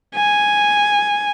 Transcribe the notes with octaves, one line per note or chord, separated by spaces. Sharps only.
G#5